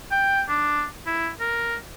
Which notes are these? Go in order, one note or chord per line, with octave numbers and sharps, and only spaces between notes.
G5
D4
E4
A#4